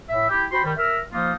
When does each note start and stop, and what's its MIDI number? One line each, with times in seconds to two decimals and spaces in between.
0.09 0.28 45
0.09 0.28 76
0.29 0.44 64
0.29 0.44 67
0.52 0.60 66
0.52 0.60 72
0.52 0.60 79
0.52 0.60 83
0.52 0.60 84
0.64 0.72 51
0.64 0.72 55
0.77 0.99 70
0.77 0.99 76
0.77 0.99 88
0.77 0.99 89
1.12 1.32 53
1.12 1.32 58
1.12 1.32 63
1.12 1.32 65